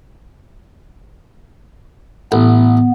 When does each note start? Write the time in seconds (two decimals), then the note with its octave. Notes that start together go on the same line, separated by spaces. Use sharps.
2.32 A1 B3